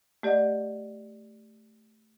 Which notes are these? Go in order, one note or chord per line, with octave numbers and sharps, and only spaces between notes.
A3 G4 D5 D#5 F#5